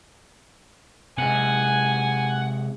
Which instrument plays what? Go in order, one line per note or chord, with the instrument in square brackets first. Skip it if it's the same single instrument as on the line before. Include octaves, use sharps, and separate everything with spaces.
[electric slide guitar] C3 G#3 [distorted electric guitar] F#5 [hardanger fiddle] G#5